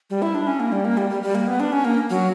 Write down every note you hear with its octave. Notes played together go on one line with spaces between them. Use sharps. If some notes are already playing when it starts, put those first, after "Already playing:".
G3
E4
D4
C#4
A#3
G3
A#3
G3
G3
G3
A#3
B3
D4
C#4
A#3
F#3